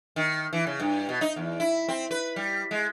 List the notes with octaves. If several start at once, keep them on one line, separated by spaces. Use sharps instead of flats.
D#3
E3
C#3
G2
B2
D#4
E2
E4
C4
B4
G3
G#3